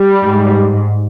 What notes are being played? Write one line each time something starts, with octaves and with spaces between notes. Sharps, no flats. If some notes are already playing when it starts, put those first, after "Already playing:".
Already playing: G3
G#2